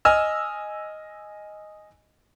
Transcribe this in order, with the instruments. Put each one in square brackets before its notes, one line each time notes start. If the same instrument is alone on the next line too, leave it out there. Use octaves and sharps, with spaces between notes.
[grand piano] D#5 G#5 E6 F6